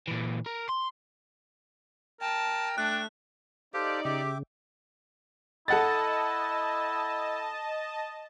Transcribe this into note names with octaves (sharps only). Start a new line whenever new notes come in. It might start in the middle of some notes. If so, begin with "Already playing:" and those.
A#2 E3
A#4
C6
A#4 G5 A5
A3 D4 F#6
D#4 G4 A4 C5 D5 F5
C#3 G4 E5 G5 D6
E4 A4 D#5 F#5 A5 A6